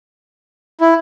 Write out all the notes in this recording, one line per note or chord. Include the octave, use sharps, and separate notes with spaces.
E4